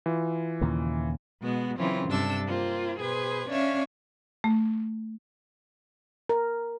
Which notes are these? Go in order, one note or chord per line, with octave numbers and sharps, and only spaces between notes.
E3 F4
D#2 A#2 C#3
B2 G#3 B3 F#4
C#3 E3 F#3 C4 C#4 F4
G2 C3 D4 A4 E6
A#3 C4 F4
B2 G#4 B4 C5 G#6
C#4 D4 C#5 E5 F5
A3
A#4